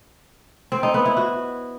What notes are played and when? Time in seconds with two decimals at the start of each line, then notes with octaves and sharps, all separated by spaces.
0.72 C4
0.83 D#4
0.94 B3
1.05 E4
1.17 F#4